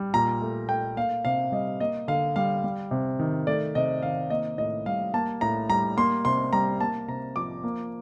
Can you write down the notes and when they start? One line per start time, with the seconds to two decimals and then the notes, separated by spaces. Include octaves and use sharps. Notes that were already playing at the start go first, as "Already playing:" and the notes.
Already playing: G3
0.14 A#2 A#5
0.42 A3
0.69 A3 G5
0.97 A#3 F5
1.25 C3 F5
1.52 G3 D#5
1.80 A#3 D#5
2.08 D3 F5
2.36 G3 F5
2.64 G3
2.91 C3
3.19 D#3
3.47 A3 D5
3.75 C3 D#5
4.02 D#3 F5
4.30 A#3 D#5
4.58 A2 D#5
4.86 G3 F5
5.14 A#3 A5
5.41 A2 A#5
5.69 G3 A#5
5.97 A#3 C6
6.25 C3 C6
6.53 G3 A#5
6.80 A#3 A5
7.08 C3 A#5
7.36 F3 D6
7.63 A#3